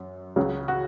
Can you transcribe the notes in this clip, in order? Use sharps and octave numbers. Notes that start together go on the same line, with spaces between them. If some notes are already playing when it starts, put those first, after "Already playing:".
Already playing: F#2 F#3
C#2 C#3 F#3
F#4